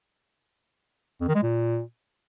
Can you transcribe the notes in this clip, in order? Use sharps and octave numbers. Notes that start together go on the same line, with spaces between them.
F2
D#3
G#3
A#2